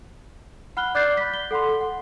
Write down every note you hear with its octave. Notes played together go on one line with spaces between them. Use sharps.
F#5 B5 F6 F#6 G7
D5 D6 F#6 G6 A6 C7
B5 B6
G7
A4 F#5 B5 C6
F#5